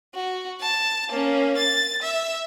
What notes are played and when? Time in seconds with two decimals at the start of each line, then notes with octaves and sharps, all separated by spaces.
0.14 F#4
0.61 A5
1.09 A#3 C#4
1.57 A6
2.02 E5